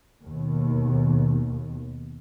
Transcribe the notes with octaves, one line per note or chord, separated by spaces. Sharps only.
D#2 B2